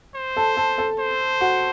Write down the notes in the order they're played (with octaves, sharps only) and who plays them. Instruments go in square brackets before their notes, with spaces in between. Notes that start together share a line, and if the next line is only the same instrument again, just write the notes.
[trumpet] C5
[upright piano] A4 A5
A4 A5
A4 A5
[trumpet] C5
[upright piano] F#4 F#5